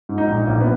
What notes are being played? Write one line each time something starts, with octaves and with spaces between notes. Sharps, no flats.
G#2
D#4
A#1
A#1 A#3
B3